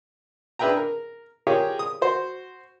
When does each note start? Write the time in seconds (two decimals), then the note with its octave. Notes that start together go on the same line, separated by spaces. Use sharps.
0.59 D4 G#4 B4 E5 G5 A#5
0.77 A#4
1.47 F4 G4 G#4 A#4 C#5
1.79 D#6
2.01 F#4 C5